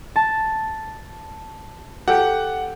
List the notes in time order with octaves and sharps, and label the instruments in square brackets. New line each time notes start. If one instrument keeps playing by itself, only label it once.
[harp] A5
[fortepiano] G4 A4 G5 [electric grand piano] F#5